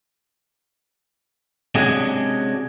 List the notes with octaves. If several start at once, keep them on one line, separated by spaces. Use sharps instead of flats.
C3 G#3 C#4 D4 F#4 G#4